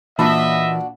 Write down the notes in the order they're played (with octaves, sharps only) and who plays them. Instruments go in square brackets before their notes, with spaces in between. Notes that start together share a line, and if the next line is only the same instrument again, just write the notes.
[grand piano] A#2 A5 B5 [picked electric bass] E3 [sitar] D4 F#4 [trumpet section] D#5 E5